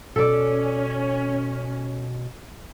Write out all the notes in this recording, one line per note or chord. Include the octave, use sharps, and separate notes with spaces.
B2 C#4 A4 D5